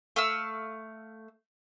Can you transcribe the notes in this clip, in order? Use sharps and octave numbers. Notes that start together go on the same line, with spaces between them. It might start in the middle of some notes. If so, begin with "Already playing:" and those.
A3 F5 E6